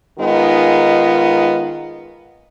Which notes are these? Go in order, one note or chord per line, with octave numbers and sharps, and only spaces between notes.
D#3 G#3 B3 D#4 F4